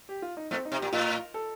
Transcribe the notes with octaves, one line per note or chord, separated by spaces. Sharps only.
G4
F4
D#4
A2 A3 C4
D#4
C3
A#2 G4
A2 F4
A4